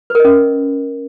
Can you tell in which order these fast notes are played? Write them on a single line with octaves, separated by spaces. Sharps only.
B4 A#4 D#5 C#4